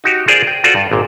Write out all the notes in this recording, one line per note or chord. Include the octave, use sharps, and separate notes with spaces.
D#4 F#4 G4
F4 G#4 A#4 C5 D5
G5
F4 F#4 A4 C5 D5
G2
G#1 A#2